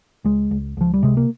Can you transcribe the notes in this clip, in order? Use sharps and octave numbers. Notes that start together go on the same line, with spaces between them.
C#2 G#3
C#2
C#2 F3
G3
C3 G#3
A#3